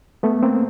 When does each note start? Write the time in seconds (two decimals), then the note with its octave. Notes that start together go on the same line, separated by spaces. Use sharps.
0.23 A3 B3
0.43 A#3 C4